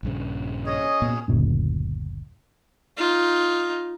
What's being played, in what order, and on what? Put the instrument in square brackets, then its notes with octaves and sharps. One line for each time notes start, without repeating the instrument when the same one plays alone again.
[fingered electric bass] A#1 G2 C#3
[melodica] C#4 G#4 C#5 [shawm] D#5
[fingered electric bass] A#2 B3
F#1 D2 A#2 C#4
[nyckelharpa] D#4 F4